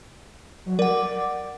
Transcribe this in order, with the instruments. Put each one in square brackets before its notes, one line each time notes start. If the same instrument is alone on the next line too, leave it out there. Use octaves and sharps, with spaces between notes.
[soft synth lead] F#3
[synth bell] A#4 F#5 [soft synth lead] D5